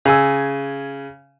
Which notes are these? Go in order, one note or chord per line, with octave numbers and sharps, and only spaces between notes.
C#3 G#5 E6